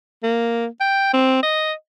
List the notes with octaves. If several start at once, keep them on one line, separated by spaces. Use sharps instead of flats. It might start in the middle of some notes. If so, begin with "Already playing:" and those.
A#3
G5
C4
D#5